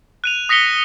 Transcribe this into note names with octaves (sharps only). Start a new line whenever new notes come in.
F#6 D#7 F7
D#6 A#6 B6 C#7 G7